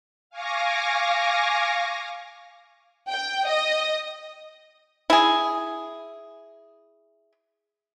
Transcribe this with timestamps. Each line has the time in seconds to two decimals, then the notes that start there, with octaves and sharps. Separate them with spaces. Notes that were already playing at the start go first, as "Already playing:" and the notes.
0.30 F5 G#5 C#6 D6 A#6
3.09 G5
3.47 D#5
5.10 E4 G#4